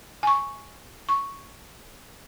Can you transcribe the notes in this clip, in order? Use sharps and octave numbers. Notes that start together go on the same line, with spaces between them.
G#5 C#6
C#6